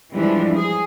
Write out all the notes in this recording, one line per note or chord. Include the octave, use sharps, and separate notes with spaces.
E3 F3 G3 G#3 D4
G#4